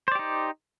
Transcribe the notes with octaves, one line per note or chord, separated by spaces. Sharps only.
D#4 G4 C5 D5